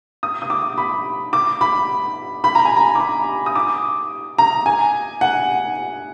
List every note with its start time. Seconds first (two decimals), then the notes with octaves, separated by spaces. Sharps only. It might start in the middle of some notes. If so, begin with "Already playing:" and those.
0.23 D#6
0.42 D#6
0.50 D6
0.78 B5
1.33 D6
1.61 B5
2.44 B5
2.55 A#5
2.65 G#5
2.77 A#5
2.95 D6
3.00 B5
3.46 D#6
3.56 D6
4.38 A#5
4.66 G#5
5.21 F#5